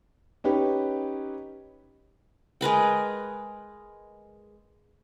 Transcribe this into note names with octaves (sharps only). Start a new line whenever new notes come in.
C#4 D#4 G4 B4
G#3 A#4 B4 G5